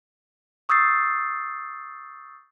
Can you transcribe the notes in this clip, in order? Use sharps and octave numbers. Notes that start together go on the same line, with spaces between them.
C#6 D#6 E6 G6 A6 C7